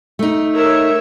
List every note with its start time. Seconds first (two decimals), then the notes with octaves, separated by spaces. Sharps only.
0.19 A3 D#4
0.56 A#4 C#5 E5